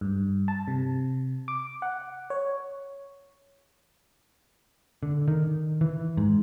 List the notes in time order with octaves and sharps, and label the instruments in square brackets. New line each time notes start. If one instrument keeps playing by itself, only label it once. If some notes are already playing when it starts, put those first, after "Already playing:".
[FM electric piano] G2
A5
C3
D6
F#5
C#5
[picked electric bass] D3
D#3
E3
G#2